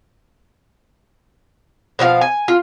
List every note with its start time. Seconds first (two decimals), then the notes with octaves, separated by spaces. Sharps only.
1.99 B2 F3 G4 F5
2.21 G#5
2.48 F4